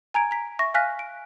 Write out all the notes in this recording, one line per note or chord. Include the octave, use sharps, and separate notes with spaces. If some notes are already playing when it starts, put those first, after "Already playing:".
G#5 A#5 G#6 D7
A#5 B6
E5 C#6 A#6
F5 G#5 F6 F#6 A#6 B6
D7